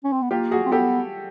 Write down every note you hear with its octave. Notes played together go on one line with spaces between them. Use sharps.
C#4
C4
B3
A#3 F4 G4
F#4 G#4
C4
B3 G4 A4